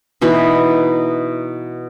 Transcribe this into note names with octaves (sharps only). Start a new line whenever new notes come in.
B2 E3 D#4 B5